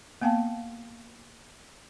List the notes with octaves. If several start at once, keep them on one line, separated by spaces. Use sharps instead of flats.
A#3 B3 F5 G5 A5